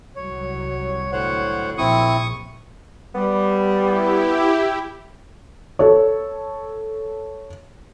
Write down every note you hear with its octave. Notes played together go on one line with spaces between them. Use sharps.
C2 F#3 C#5
A2 D3 C5 C#5 F#5
A#1 C4 E4 C#6 D#6
G3 B3
E4 G4
A4 C#5